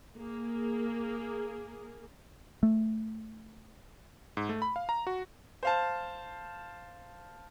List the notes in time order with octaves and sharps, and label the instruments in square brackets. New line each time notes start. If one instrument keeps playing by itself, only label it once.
[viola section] A#3 G#4
[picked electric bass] A3
[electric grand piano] G#2
A3
B5
F5
A#5
F#4
[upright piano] C5 F5 A5